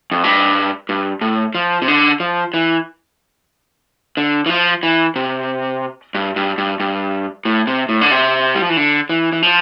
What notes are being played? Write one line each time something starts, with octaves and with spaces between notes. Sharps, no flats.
F2
G2
G2
A2
F3
C3
D3
F3
E3
D3
E3
F3
E3
C3
G2
G2
G2
G2
A2
C3
A2
D3
C3
G3
F3
E3
D3
E3
E3
F3